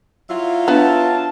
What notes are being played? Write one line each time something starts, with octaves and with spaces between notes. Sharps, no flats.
F#3 E4 F4
B3 D4 A5